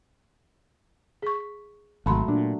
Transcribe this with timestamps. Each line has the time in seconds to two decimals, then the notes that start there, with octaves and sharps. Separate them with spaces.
1.22 G#4 C#6 B6
2.06 G#1 F#3 G#3 A3 B5 C6
2.28 A#2 D4